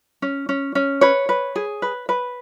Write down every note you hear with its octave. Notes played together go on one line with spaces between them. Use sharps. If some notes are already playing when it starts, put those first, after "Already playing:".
C#4
C#4
C#4
B4 C#5
B4
G#4
B4
B4